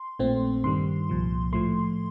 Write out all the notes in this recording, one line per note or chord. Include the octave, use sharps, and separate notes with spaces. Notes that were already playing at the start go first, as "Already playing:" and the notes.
Already playing: C6
A#1 A#2 A3 C4
G2 D#3 G3 C6
C2 A#2 F3
A2 F3 A3 C6